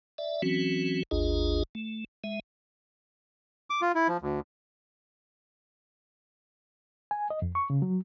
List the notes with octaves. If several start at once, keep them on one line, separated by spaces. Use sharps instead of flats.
D5 E5
E3 F#3 C4 C#4 F#4
G#1 D#2 D4 F4 G#4 D#5
A3
G#3 E5
D6
F4
E4
F3
D2
G#5
D#5
F2
C#6
C#3
F#3